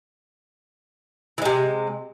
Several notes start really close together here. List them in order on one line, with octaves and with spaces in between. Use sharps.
E3 G#3 C3